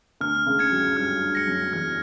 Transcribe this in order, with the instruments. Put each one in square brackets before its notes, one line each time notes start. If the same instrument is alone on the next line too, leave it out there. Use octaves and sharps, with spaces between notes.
[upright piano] D2 D3 [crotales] F6
[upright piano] C#2 C#3
[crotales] G#6 C#7
[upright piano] F#2 F#3
[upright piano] G2 G3 [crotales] F6
[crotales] A#6 C#7
[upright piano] F#2 F#3
[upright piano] E2 E3 [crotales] F6